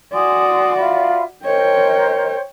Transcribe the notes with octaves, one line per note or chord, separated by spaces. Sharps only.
F#4 D5 G#5 C6 D#6
F4 E5 B5
A#4 C5 C#5 D#5 G5